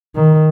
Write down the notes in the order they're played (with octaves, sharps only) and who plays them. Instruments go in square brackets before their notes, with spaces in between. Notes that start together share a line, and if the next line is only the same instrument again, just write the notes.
[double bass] D#3